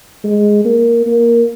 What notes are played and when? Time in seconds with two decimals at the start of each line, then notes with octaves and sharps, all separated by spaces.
0.24 G#3
0.65 A#3
1.06 A#3